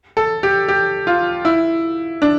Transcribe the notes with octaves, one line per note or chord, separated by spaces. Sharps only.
A4
G4
G4
F4
E4
D4